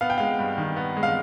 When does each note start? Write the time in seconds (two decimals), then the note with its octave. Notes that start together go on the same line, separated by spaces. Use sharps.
0.01 B3 F5
0.10 G5
0.18 G#3 F5
0.39 G2
0.58 D#3
0.76 B3
0.97 G#3
1.03 F5